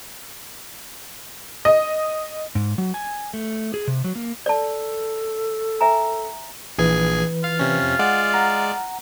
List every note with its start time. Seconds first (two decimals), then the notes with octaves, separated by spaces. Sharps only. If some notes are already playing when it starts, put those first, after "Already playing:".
1.65 D#5
2.55 G#2
2.78 F#3
2.94 G#5
3.34 A3
3.74 G#4
3.87 C3
4.04 F#3
4.15 A#3
4.46 A4 D5 A5
5.81 E5 G#5 A#5
6.78 A#1 E3 G#4 B4 G#5
7.44 F4 F5
7.59 C3 C#4
7.82 F2
7.99 G#3 D5 F#5
8.34 F#5 A#5